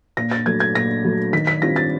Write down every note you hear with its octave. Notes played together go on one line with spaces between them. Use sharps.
A#2 A#6
A6
F#3 A3 G#6
G#6
A#2 A#6
F#3 A3
D#3 B6
B6
G3 C4 F4 A#6
A6